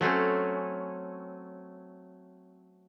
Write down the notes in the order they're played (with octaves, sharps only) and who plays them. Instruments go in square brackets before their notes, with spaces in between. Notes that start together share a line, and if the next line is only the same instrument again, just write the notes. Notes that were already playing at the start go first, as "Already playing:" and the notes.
[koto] F#3 A3 C4 C#4